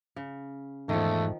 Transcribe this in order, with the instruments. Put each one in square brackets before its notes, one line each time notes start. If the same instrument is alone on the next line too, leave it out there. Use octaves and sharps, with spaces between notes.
[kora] C#3
[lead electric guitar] E2 [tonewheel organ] G#2 [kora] D#3 F3 [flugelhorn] A3